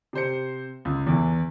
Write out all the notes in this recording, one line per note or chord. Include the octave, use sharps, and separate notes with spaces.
C3 C5 C#7
C#2
E2 E3